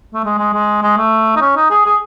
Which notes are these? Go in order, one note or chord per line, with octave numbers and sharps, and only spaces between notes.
A3
G#3
G#3
G#3
G#3
A3
D#4
C#4
D#4
G#4
G#4